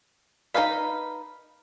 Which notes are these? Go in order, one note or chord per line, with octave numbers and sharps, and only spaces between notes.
D#4 A4 B4 F5 B5